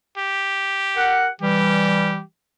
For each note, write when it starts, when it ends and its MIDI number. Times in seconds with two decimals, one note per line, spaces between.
0.17 1.32 67
0.97 1.28 70
0.97 1.28 78
1.41 2.20 52
1.41 2.20 55
1.41 2.22 67